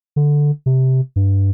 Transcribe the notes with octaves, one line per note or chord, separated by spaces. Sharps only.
D3
C3
G2